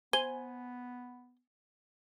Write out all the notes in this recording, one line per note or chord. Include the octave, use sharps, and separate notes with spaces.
B3 C5 G#5 G7